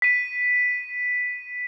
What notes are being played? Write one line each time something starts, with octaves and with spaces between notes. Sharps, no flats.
B6 D#7